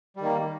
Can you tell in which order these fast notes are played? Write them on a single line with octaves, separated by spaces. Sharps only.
G3 D#3 A#3